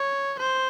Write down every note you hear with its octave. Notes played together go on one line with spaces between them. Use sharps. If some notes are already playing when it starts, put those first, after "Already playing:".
Already playing: C#5
C5